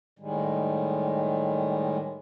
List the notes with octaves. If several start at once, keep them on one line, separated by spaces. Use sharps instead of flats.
A2 D#3 G3 G#3